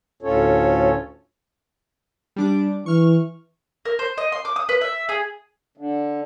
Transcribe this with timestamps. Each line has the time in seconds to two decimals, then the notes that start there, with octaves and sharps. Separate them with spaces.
0.23 D2 A2 C#4 F4 A4 C#5
2.36 G3 D4 D6
2.86 E3 C#6 F6
3.85 A#4
3.99 C5
4.18 D#5
4.32 C6
4.45 D6
4.56 D#6
4.69 B4
4.81 E5
5.09 G#4
5.77 D3